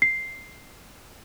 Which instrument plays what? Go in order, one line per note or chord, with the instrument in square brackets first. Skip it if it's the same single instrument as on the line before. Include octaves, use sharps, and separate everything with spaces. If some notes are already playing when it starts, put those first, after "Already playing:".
[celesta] C7